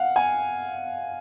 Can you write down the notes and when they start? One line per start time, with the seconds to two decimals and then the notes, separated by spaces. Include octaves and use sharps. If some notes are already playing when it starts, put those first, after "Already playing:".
Already playing: F5 F#5
0.16 G#5